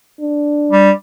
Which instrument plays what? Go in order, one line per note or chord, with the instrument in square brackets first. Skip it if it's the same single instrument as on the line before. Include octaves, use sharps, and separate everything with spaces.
[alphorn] D4
[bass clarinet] G3